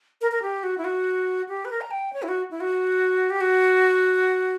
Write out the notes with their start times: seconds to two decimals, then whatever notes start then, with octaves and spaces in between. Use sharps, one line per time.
0.21 A#4
0.31 A#4
0.42 G4
0.63 F#4
0.78 E4
0.84 F#4
1.49 G4
1.65 B4
1.71 A#4
1.81 A#5
1.91 G5
2.13 C#5
2.23 E4
2.28 F#4
2.51 E4
2.60 F#4
3.30 G4
3.41 F#4